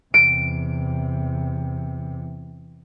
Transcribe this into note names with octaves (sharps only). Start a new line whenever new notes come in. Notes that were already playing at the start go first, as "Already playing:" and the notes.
E2 C3 D7